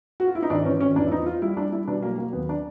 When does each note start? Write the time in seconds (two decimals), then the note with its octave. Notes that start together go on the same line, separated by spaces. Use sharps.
0.20 F#4
0.28 F4
0.35 E4
0.42 D#4
0.50 G#1 D4
0.65 E3 C#4
0.81 G#1 C#4
0.96 E2 D4
1.06 E4
1.11 F3 D#4
1.26 F3 F4
1.42 G3 E4
1.57 G3 D4
1.72 G3 E4
1.88 B2 D4
2.02 F#3 A#3
2.18 F#3 A#3
2.33 D#2 B3
2.49 D4